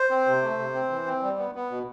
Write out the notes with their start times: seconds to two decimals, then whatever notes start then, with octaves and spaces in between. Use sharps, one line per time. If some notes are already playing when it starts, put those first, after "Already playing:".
Already playing: C5
0.10 C4
0.26 C3
0.42 A3
0.58 C3
0.75 C4
0.90 E3
1.06 C4
1.23 G3
1.38 B3
1.55 B3
1.71 B2